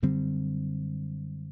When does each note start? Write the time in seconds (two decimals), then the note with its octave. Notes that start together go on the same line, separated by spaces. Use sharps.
0.03 F#2 D3 G3 C4